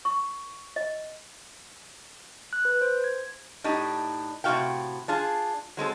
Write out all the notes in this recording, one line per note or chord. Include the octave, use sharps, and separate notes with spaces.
C#6
D#5
F#6
B4
C5
G#6
A2 D4 D#4 G4
A2 C3 D4 F#4 F5 G5
D4 F4 G#4
F#3 G#3 C4 A4